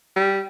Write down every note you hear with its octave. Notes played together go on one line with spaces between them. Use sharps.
G3